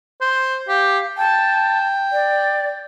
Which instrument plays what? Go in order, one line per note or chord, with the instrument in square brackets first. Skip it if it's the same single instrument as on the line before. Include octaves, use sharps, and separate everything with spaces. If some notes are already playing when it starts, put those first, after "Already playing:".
[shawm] C5
[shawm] G4 [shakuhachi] F5
[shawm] G5 [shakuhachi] A5
[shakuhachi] D5